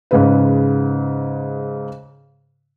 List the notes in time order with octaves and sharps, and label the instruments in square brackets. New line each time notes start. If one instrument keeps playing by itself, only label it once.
[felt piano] G#2 C#3 B4